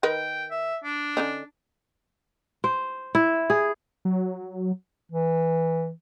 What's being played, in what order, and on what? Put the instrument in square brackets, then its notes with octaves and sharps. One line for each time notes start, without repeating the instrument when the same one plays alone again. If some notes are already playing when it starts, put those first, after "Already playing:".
[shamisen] D#3 A#4 B4 [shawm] G5
[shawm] E5
D4
[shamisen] D3 C#4 D#4
[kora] C5
E4
G#4
[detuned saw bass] F#3
[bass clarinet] E3